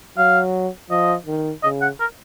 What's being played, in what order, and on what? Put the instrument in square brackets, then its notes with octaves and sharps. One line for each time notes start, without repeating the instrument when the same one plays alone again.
[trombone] F#3 [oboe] F5
[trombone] F3 [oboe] D#5
[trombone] D#3
[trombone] C#3 [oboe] D#5
[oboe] F#5
A#4